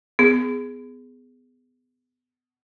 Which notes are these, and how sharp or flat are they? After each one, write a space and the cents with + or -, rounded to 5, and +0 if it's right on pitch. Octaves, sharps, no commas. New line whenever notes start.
B3 +25 G#4 +0